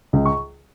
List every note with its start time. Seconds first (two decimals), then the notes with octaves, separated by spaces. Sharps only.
0.13 C#2
0.26 C#6